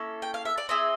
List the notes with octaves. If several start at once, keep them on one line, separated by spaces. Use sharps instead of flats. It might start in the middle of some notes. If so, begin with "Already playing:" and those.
Already playing: A#3 C#4 E4 A4
G5
F5
E5
D5
C4 E4 G#4 D#5